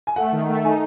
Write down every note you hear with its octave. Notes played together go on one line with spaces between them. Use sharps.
G#5
A3 F#5
D#3
A3
D#4 G#5